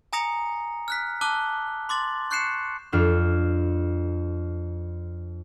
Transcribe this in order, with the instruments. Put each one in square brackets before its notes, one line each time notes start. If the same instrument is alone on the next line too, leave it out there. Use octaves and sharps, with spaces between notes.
[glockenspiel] G#5 A#5 D#6 A#6 C#7 F7
F6 F#6 B6
A5 D6 E6 F#6 G7
C6 D6 A6 F#7
C#6 F#6 G6 C7 C#7 E7
[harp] F2 D4 F6